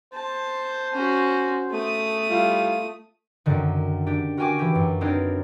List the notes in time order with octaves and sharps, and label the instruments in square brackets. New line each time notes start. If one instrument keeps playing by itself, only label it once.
[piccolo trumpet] C5 [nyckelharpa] A5
[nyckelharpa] C#4 F#4
A3 D#6
[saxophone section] G3 E4 F4
[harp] F#2 D3 D#3
D4 G4
F#4 A#4 G5 G#5 C#6 D6
E3 G4
F#2
C4 D4 D#4 A#4 B4 C#5